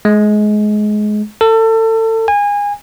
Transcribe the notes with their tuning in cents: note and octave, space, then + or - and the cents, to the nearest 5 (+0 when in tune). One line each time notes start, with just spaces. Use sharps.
G#3 +25
A4 +30
G#5 -25